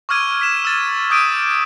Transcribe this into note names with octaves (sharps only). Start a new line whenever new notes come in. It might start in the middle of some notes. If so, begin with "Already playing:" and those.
C#6 D6 E6 F6 G#6 D#7
B6 E7
E6 A6 D#7
D6 D#6 G6 B6 D7 D#7